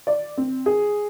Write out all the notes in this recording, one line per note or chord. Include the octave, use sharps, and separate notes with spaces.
D5
C4
G#4